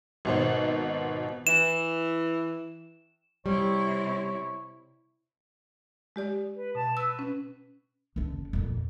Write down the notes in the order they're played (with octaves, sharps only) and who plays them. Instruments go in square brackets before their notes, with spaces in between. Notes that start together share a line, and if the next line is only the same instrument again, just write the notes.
[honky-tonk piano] G#1 B2 C5
[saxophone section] E3 [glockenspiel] E7
[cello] C3 E4 [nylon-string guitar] G3 [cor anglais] C#5
[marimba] G#3 G4 D5
[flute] B4
[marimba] B2 [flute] A5
[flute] B4 [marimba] E6
[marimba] C#4
[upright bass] F#1 D3
F2 A#2